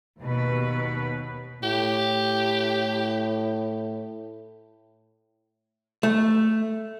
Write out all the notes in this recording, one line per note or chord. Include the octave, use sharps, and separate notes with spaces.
D#2 B2 B4
A2 G4
A3